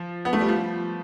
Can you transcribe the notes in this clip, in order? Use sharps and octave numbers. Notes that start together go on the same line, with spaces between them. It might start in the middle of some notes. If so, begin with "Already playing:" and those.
Already playing: F3
B3
A3
G3
F3